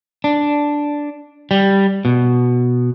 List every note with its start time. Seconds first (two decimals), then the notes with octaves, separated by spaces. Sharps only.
0.24 D4
1.51 G3
2.05 B2